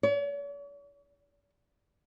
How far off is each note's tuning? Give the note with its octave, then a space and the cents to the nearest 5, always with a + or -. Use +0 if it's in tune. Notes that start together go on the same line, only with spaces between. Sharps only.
C#5 +45